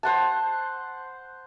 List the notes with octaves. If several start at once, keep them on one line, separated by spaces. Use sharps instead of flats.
C5 F#5 A5